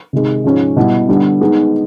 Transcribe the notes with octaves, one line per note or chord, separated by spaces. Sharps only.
C3 D#3 G#3
G#2 F3 G#3 C#4
B2 G3 B3 E4
D3 G3 B3
D#3 G#3 B3 D#4